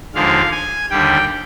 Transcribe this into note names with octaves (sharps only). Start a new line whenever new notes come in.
D#2 D3 F3 G#3 F5
G#5
D#2 D3 G3 G5